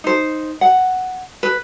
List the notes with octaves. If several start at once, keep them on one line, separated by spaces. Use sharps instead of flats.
D#4 C5
F#5
B4